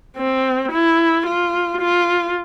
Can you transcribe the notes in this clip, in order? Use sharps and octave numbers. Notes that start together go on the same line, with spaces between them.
C4
E4
F4
F4